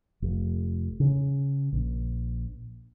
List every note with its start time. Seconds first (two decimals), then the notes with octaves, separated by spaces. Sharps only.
0.22 F1
1.00 C#3
1.72 A#1